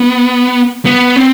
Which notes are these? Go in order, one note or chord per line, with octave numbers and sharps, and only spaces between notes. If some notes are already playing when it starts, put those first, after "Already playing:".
Already playing: B3
B3
C4